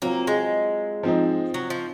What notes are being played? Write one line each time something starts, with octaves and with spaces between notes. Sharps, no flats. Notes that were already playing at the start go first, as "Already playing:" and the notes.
F#3 A#3 C4 F4
G#3
F3 C4 D#4
F#3
F3